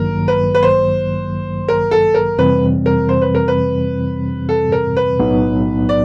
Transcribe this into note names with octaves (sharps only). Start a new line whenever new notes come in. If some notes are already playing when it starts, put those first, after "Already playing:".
Already playing: A1 G2 D#3 F#3 A#3 A#4
B4
B4
C5
A#4
A4
A#4
F2 C3 E3 G3 C4 B4
A#4
C5
B4
A#4
B4
A4
A#4
B4
B1 A2 F#3 B3 D#4
D5